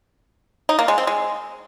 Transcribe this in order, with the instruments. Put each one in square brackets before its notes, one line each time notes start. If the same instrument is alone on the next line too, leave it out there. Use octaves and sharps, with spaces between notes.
[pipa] D#4
A#3
G#3
C4
G#3